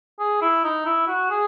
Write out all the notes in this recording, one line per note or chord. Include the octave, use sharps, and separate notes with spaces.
G#4
E4
D#4
E4
F#4
G#4